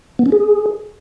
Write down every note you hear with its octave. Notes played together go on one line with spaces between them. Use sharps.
B3
C#4
G#4